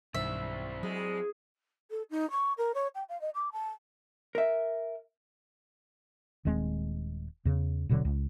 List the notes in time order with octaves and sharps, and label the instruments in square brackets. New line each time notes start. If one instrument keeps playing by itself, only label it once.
[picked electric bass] B1 G2 D#3 [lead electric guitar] C4 E4 [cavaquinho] E5
[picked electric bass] F#3 [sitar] G#3
[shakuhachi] A4
D#4
C#6
A#4
C#5
G5
F5
D#5
D6
A5
[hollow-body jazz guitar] A#4 E5
[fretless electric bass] D#1 D#2 G#3 C4
E2 C#3
D#1 B2 D3 F#3
C#2